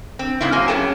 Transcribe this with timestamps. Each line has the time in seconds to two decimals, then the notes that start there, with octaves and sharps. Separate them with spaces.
0.19 C4
0.41 G#2 C#3 C4 E4
0.52 F#3 A#3 G#5
0.68 F#2 C#4 G#4 G5 A5